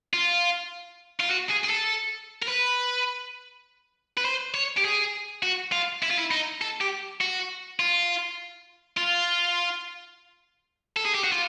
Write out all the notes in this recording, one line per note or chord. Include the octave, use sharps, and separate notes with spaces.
F4
F4
F#4
G#4
G#4
A4
A#4
B4
B4
C5
C#5
G4
G#4
F#4
F4
E4
F4
E4
D#4
A4
G4
F#4
F4
F4
A4
G#4
G4
F#4
F4